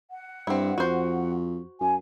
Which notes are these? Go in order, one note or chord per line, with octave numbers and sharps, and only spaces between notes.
F#5
G2 C4 E4
F2 F#4 C5
F#2 G#5